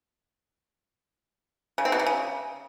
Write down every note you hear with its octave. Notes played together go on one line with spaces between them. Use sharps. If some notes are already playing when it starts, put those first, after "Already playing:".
C#3
C4
B2
C3
C#3